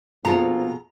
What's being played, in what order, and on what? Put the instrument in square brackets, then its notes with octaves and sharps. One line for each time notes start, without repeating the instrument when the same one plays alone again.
[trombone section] A#1 C4 G#4 [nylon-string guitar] B2 F4 A4 [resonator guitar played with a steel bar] A#5